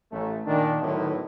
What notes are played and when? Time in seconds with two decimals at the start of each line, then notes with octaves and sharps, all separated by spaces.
0.12 A1 A3
0.47 A#2 D#3 D4
0.81 A2 D3 D#3 F#3 A3 B3